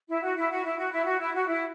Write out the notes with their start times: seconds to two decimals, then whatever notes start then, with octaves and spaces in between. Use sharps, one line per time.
0.08 E4
0.22 F#4
0.37 E4
0.50 F#4
0.64 E4
0.77 F#4
0.91 E4
1.05 F#4
1.19 E4
1.33 F#4
1.47 E4